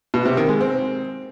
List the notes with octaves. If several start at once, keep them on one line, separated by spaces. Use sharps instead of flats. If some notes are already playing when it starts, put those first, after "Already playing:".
B2
C3
D#3
G#3
C4